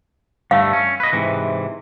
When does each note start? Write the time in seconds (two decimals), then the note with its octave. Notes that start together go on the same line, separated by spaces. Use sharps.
0.51 G2 D3 A3 F5
0.73 C#4
1.00 B4 D#5
1.13 G#2 C3 E3